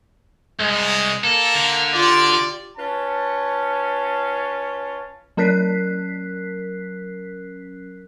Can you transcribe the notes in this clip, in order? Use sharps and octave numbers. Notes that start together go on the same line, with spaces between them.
C2 G#3
A#3 A4
D3
F4 G4 D5
C#4 F4 B4 A5
F#3 C#4 A#4 F#6 B6 C7